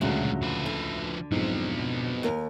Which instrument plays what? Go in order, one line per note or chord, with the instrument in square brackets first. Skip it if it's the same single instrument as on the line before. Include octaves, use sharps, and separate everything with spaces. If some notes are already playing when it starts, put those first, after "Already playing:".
[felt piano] D2 C#3 A3 [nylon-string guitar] A#2 F#3 [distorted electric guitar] G#3 D4
[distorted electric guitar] F3 B4
[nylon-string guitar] D3
[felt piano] F2 G#2 [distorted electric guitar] F#3 B3
[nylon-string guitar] D#2 A#4